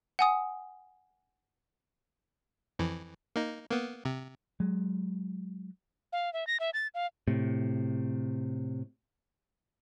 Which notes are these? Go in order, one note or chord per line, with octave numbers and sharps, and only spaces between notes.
F#5 G#5 D#6
F2 E3
A#3 D#4
A#3 B3
C3
F#3 G#3
F5
E5
A#6
E5
A6
F5
A2 C3